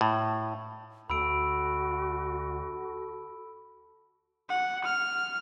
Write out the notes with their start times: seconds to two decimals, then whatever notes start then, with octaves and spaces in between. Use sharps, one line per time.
0.01 A2
1.10 D2 F#4 A4 B5 E6 D7
4.49 F#5
4.84 F6